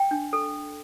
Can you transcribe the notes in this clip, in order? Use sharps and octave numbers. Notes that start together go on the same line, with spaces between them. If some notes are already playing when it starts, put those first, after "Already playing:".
Already playing: G5
D4
A4